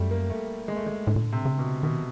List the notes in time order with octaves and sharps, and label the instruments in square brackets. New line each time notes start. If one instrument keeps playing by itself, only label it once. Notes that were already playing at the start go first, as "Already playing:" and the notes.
Already playing: [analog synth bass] F#2 [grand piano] G3 A3
[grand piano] A#3
A3
G#3
A3
G#3
[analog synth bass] A2 [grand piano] D3
[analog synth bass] A#2
A2
[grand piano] C3
[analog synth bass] C#3
[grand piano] B2
[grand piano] B2 [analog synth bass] D#3